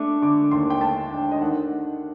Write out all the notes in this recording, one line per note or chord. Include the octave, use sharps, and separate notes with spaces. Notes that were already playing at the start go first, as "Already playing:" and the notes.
Already playing: A3 D4 D6
D3 D6
D#2 C6
G5
A3 A5
D4 G5
D#5
D#3 F#5